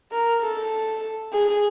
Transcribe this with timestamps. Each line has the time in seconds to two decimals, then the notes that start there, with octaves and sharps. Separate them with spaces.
0.12 A#4
0.43 A4
1.33 G#4